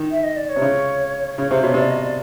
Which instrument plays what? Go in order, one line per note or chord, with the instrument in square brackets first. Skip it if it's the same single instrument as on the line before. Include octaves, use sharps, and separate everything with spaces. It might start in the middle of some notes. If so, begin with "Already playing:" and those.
Already playing: [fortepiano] D#3
[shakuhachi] E5
D#5
D5
C#5
[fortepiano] C3
C#3
[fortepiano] C#3 [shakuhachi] C#5
[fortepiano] C3 [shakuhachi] C5
[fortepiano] B2 [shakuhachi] C#5
[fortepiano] C3 [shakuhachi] D5
[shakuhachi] D#5
D5